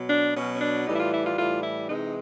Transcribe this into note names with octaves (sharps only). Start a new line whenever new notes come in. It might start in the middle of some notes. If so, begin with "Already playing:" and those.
Already playing: B2 F#3
D4
B2 F#3 C#4
C#4
D4
A2 E3 G3 D#4
E4
F4
E4
F4
A2 E3 G3 F4
E4
C3 E3 G#3 D#4